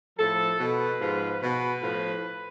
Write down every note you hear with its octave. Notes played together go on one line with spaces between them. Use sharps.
A2 F3 A4
B2 B4
G#2 F3
B2 B4
A2 F3